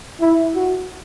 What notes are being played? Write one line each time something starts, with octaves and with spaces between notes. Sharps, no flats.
E4
F#4